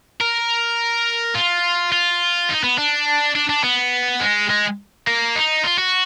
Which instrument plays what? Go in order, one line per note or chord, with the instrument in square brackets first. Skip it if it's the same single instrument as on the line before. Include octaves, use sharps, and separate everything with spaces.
[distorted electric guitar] A#4
F4
F4
D#4
B3
D4
D4
D4
B3
G#3
G#3
A#3
D#4
F4
F#4